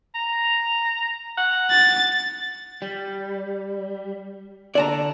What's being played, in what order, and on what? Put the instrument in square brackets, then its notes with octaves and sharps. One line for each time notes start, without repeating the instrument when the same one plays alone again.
[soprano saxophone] A#5
F#5
[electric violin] A6
[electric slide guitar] G3
[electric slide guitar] D3 [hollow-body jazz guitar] D5 A5 A#5